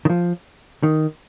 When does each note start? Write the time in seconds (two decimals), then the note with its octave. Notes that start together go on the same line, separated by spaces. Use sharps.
0.05 D#3
0.10 F3
0.83 D#3